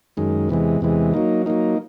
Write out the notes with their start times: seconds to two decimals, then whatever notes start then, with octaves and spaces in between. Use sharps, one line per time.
0.17 F#2 D#3 G#3
0.49 E2 C3 E3 G#3
0.81 E2 C3 E3 G#3
1.14 F#3 A#3 D#4
1.46 F#3 A#3 D#4